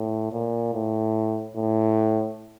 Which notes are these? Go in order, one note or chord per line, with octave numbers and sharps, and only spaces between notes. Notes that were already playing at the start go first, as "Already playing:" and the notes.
Already playing: A2
A#2
A2
A2